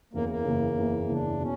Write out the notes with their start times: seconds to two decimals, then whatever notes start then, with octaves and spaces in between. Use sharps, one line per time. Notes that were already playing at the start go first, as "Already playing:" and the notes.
0.13 F#1 E2 C#3 A#3
0.29 A#3
0.45 F#1 E2 C#3
0.77 F#1 E2 C#3
1.09 F#1 E2 C#3 D4
1.41 B2 C#4